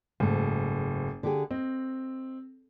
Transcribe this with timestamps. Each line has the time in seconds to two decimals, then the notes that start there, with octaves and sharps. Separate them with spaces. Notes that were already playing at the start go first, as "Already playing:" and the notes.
0.20 F#1 G#2 A3
1.23 D3 G4 G#4
1.51 C4 D#5